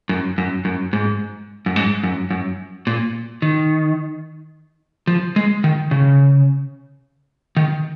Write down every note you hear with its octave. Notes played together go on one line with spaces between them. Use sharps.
F#2
F#2
F#2
G#2
F#2
G#2
F#2
F#2
A#2
D#3
F3
G#3
D#3
C#3
D#3